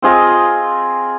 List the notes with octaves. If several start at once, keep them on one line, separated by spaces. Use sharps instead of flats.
C4 F4 G#4 D#5